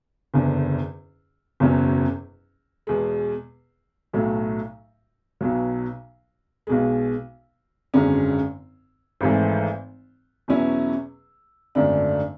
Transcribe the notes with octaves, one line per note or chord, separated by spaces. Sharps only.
F#1 E2 D3
F#1 E2 B2 F#3 C#4
E2 B2 G#3
B1 A2 F#3 A3
B1 B2 F#3
B1 B2 G#3
G#1 F#2 D3 G#3 C#4
G#1 G#2 E3 A3
E2 B2 F#3 C#4 E4
G#1 F#2 D3 A3 D4